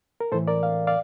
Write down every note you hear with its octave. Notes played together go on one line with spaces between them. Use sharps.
A#4
A2 E3 A4 C5
A#4 D5
F5
D5 F5